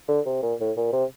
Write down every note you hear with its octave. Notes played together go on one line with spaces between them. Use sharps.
D3
C3
A#2
A2
A#2
C3